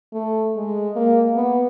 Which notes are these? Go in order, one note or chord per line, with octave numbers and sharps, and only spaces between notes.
A3
G#3
A#3
B3